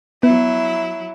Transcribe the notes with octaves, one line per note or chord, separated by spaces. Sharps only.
F#3 B3 E4